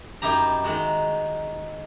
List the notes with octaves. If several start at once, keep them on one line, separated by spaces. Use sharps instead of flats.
F#2 D#4 E4 G4 A#5
D#3 G#3 F#4